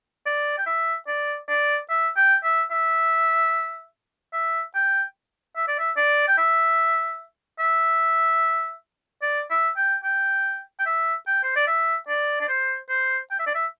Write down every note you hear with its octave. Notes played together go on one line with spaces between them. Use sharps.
D5
G5
E5
D5
D5
E5
G5
E5
E5
E5
G5
E5
D5
E5
D5
G5
E5
E5
D5
E5
G5
G5
G5
E5
G5
C5
D5
E5
D5
D5
C5
C5
G5
E5
D5
E5